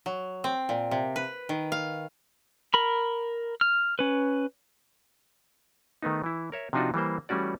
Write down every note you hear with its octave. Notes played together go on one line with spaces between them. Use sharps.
F#3
C4
A#2
C3
B4
D#3
F5
A#4 B5
F6
C#4 B4
D#3 A3 B3 D#4
E3 E4
A#4 C#5 E5
C3 F3 D4 D#4 F4 F#4
E3 G3 A#3 C5
E3 G3 A3 C#4 F#4 D5